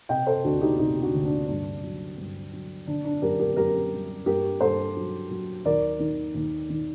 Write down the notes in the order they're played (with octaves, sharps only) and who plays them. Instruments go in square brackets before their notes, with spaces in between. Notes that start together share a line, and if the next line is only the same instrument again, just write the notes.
[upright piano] C3 D#5 G5
A4 C5
D2 D4 F#4
D#4 G4
C3 D#4 G4
D4 F#4
D2
D4
G2 D4
F#3
G2
F#3
D3 D4
D4
F#2 G4 A#4
G4 A#4
F#2 G4 A#4
G3
G2 G4 A#4
G2 A4 C5
F#3
F#3
D#2 A#4 D5
D#3
D#2
D#3